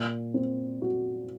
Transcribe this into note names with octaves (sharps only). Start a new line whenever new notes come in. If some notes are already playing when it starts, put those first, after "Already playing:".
Already playing: A#2
C4
F#4